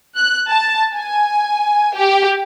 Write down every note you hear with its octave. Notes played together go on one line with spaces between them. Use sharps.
F#6
A5
G#5
G4